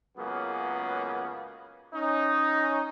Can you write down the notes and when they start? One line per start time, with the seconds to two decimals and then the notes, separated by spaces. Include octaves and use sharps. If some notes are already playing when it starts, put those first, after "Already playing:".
0.17 C#2 F#2 C#3 A#3 B3
1.94 C#4 D#4